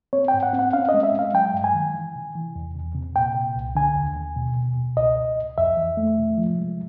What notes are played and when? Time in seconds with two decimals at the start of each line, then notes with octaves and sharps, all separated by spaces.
0.13 C4 C#5
0.28 G5
0.34 G#2
0.43 F#5
0.53 C4
0.59 F#5
0.73 C#4 F5
0.89 D#5
0.94 G#3
1.03 E5
1.13 G#3
1.19 F5
1.34 F#3 G5
1.54 G2
1.64 G#5
1.74 D#3
1.94 E3
2.15 C3
2.35 E3
2.56 E2
2.75 C3
2.95 C3
3.16 A#2 G5
3.35 A#2
3.56 C2
3.75 D3 G#5
3.96 D#2
4.16 D#2
4.36 B2
4.57 B2
4.76 B2
4.97 C#2 D#5
5.17 C#2
5.38 C#2
5.58 F2 E5
5.77 E3
5.97 A3
6.19 C3
6.38 F3
6.59 G#3